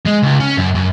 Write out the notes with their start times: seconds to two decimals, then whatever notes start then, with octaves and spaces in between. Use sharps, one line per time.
0.05 G#3
0.23 C#2
0.40 C#4
0.57 F#2
0.75 F#2